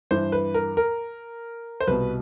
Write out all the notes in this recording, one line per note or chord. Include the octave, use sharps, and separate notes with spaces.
G2 E3 C5
B4
A#4
A#4
C5
C2 B2 B4